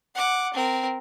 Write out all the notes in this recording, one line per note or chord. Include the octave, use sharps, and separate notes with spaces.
F#5 D6
C4 A#4